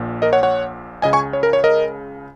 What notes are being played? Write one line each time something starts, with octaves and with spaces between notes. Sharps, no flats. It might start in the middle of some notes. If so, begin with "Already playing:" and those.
Already playing: A#1 A#2
A#4 D#5
C#5 F#5
C#5 F#5
C#2 C#3 D#5 G#5
G#5 C#6
C#5
A#4
C#5
A#4 D#5